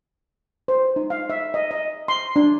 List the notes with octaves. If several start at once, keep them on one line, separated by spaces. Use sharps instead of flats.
C5
D#4
F5
E5
D#5
D#5
C6
D4